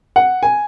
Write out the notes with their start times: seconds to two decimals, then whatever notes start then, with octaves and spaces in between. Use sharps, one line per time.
0.16 F#5
0.43 G#5